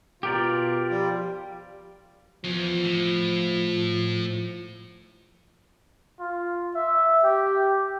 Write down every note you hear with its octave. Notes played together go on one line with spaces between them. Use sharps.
B2 F4 G4 A#4 D5
F3 G3 F4
E2 F3
A2
F4
E5
G4